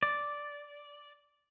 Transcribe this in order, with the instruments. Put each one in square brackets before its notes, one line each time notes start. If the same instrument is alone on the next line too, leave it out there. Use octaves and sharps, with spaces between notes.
[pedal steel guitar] D5